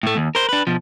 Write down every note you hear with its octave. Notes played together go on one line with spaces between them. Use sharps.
A2 A3
D#2
A#4 C5
D4 B4
B2 F3